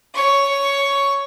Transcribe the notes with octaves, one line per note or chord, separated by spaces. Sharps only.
C#5 C#6